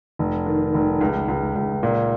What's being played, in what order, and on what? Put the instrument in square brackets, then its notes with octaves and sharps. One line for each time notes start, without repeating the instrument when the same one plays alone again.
[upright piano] F1
D#3
F1
C#2
C#2
C#2
A#2